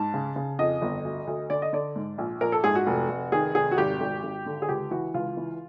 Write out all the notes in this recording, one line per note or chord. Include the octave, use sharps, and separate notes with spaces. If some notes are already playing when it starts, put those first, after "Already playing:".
Already playing: G#2 A5
C#3
C#3
F2 D#5
G1
D2
D2
D3 D5
D#5
D3 D5
G#2
A#1
A#1 A#4
A4
G#2 G#4
F#4
F1
F1
D#3 G#4
F1 G#4
F#4
G#1 G4
G#1
G#1
D3
G#4
C#2 G4
E3 F#4
C#2 F4
E3